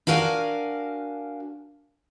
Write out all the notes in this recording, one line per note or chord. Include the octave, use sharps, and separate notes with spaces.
D4 F#4 A#4 F5 G#5